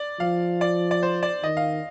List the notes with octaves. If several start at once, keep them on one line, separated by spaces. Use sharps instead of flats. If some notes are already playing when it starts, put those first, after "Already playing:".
Already playing: D5
F3 F5
D5
D5
C5
D5
D#3 D#5
F5